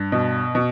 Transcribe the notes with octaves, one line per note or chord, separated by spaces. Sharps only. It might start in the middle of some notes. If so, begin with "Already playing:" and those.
Already playing: G2
B2
B2